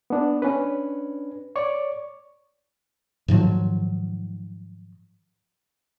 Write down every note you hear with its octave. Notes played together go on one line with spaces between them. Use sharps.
B3 D4
C#4 D4 B4
C#5 D5 C#6 D6
G#2 D#3 F3 F#3